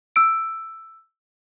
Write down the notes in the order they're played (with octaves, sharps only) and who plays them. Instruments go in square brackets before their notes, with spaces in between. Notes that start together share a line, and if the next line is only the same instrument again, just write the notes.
[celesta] E6 D7